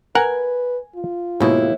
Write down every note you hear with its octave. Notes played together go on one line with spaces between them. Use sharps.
A#4 B4 F#5 G#5 A#5
F4
D#2 G#2 B2 E4